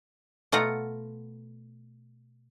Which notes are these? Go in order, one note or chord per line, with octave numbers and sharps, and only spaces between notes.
B2 A3 F4 F#5 A#5